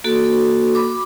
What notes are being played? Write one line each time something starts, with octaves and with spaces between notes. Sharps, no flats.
A#3 F#4 A4
B5 D6